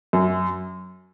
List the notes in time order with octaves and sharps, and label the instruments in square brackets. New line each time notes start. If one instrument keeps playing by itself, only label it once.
[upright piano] F#2